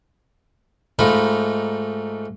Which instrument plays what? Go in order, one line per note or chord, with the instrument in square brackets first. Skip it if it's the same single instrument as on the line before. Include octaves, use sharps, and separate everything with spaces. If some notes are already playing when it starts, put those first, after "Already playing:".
[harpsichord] G#2 A3 D#4 F4 B5